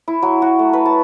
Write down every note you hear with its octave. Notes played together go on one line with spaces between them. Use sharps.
E4
F#3
F#4
A3
B4
A5